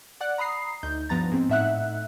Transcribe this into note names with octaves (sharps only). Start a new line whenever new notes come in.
D5 F#5 F#6
A#5 B5 D#6 C7
D2 D#4 G6
G2 F3 B3 A#5 A6
G#2 C4
A2 D#4 E5 F#5 F#6